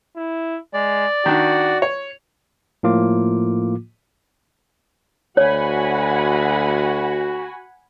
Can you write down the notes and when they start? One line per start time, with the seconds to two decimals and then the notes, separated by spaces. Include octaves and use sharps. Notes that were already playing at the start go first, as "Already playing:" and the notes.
0.16 E4
0.74 G#3 D5
1.26 D#3 D4 F#4
1.82 C#5
2.83 A2 F3 A#3 F4 D6
5.37 D2 F#4 C#5 F#5 G#5 B5